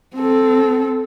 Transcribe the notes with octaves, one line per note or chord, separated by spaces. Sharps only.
C4 A4